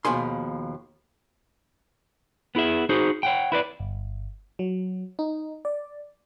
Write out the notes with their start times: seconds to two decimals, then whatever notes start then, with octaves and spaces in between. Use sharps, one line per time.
0.05 D#2 B2 F3 G#4 C6
2.55 B3 E4 G#4 E5
2.89 D#4 F#4 G#4 C5
3.23 C#5 F#5 G5
3.52 E4 B4 D5
3.80 G1
4.59 F#3
5.19 D#4
5.65 D5